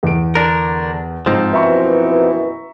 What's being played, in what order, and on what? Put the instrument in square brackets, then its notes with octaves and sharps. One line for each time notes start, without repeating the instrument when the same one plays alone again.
[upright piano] E2 D7
[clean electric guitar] D3 D4 A#4
[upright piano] G#2 [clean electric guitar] F3 C4 D#4
[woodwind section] F#2 B2 E3 [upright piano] E5 A#5 C#6